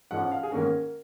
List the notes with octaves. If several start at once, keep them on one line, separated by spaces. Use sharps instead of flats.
G#2 F3 G#3 C#4 F#5
F5
G#4
G#2 D#3 A#3 C#4 A#4